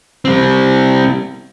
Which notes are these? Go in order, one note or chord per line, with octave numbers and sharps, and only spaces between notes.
G3 C4